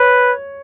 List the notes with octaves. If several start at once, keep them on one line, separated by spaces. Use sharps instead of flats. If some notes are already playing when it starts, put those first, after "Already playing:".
Already playing: B4 C#5